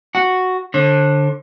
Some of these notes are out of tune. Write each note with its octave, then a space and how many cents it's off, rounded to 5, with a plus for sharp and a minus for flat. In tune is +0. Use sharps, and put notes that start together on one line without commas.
F#4 +0 F#5 +0
D3 +0 C5 +45